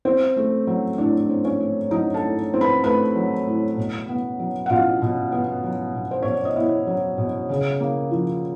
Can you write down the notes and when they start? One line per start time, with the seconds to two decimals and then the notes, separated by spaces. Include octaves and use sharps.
0.05 C4 C5
0.36 A3
0.67 F#3
0.98 A2 D4 D5
1.29 C4
1.45 C#4 C#5
1.60 A3
1.91 F#3 D#4 D#5
2.14 A4 A5
2.22 A2
2.54 C4
2.61 B4 B5
2.84 A3 B4 B5
3.16 F#3
3.46 A2
3.77 B2
4.09 B3
4.40 F#3
4.66 F#5
4.70 B2 F4 F5
5.02 B2
5.32 B3
5.64 F#3
5.94 B2
6.11 C5
6.23 B2 C#5
6.34 D5
6.45 D#5
6.56 B3 E4 E5
6.87 F#3
7.18 B2
7.49 C#3
7.80 A#3
8.11 F3